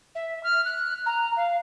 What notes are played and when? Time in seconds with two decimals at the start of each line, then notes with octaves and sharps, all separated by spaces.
0.15 E5
0.43 F6
0.65 F#6
1.06 A#5
1.36 F5